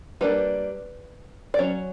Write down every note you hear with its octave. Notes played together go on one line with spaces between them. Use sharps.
G3 A#3 D4 B4
D5
F#3 C#4 C#5